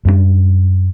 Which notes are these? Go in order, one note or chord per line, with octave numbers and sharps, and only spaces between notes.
F#2 G3 G#3 D4